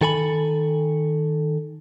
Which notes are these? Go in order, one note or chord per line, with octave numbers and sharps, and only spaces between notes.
D#3 A4 G#5 B5